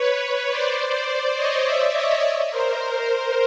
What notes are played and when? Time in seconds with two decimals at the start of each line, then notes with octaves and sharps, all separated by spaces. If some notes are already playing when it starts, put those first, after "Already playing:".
Already playing: B4 C#5
0.22 B4 C#5
0.50 C5 D5
0.79 C5 D5
1.36 C#5 D#5
1.64 D5 E5
1.93 C#5 D#5
2.51 A#4 C5